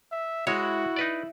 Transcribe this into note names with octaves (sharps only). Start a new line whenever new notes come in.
E5
G#3 E4 F#4 C#5
D#4 B4 D5